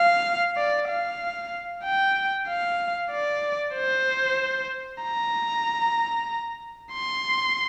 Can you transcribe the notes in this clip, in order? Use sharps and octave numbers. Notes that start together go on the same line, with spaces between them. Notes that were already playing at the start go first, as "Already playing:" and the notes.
Already playing: F5
D5
F5
G5
F5
D5
C5
A#5
C6